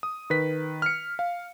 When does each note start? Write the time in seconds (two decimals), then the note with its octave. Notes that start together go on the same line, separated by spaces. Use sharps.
0.03 D#6
0.30 D#3 B4 B6
0.82 F6 C#7
1.19 F5